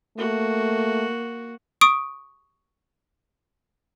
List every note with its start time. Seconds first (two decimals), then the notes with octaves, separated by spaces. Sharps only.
0.17 A3 A#3 F#4
1.81 C#6 D#6 D7